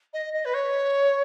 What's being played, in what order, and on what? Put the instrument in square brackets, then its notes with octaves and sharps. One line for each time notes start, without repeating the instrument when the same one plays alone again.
[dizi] D#5
D#5
B4
C#5